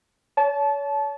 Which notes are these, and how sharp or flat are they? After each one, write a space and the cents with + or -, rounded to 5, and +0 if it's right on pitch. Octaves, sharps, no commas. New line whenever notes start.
C#5 +35 A5 -25